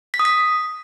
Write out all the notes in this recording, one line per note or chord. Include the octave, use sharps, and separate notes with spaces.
B6
D#6
B6